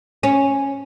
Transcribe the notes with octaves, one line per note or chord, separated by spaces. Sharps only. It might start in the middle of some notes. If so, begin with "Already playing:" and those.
C#4